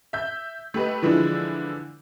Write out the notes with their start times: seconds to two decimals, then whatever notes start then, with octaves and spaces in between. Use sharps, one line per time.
0.13 E5 G6
0.74 A3 G4 B4 D#5
1.02 D3 E3 F3 G#3 D4 E4